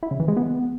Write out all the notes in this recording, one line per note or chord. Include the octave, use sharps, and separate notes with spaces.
E4
C#3
E3
G#3
B3